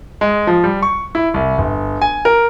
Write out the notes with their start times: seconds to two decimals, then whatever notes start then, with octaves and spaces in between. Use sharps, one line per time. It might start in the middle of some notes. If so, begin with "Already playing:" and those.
0.21 G#3
0.47 F3
0.64 G3
0.82 C#6
1.15 E4
1.34 C2
1.58 G1
2.01 G#5
2.25 A#4